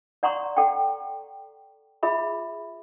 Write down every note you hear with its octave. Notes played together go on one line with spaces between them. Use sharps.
D5 F#5 A#5 C6 C#6
A4 F#5 G5
F4 G#4 E5 B5